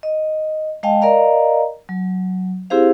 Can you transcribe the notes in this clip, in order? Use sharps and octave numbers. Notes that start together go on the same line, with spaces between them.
D#5
G#3 D#5 F5 G5 A5
A#4 D5 D#5 F5 A#5
F#3
C4 E4 G4 G#4 C5 F5